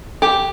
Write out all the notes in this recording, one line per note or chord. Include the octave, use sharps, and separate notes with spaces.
G4